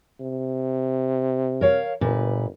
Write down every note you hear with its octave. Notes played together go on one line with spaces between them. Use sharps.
C3
A#4 C#5 F5
G1 A#2 B4